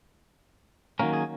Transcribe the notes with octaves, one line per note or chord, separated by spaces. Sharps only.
D#3 F#3 A#3 C#4 A#4
G#4